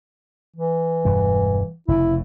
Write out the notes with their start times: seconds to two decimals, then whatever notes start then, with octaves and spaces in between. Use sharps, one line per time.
0.57 E3
1.05 E1 G2 G3
1.88 F1 A2 C#3 E4